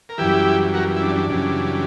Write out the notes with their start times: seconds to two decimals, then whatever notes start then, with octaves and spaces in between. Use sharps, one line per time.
0.09 A#4
0.18 F#2 E3 G3 E4 G4
0.74 F#4 A#4
0.96 E4
1.01 D4
1.16 D4
1.29 F#2 C#3 E3 G3